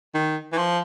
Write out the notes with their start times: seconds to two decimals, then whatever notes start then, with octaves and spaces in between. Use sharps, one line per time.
0.14 D#3
0.52 E3
0.57 F3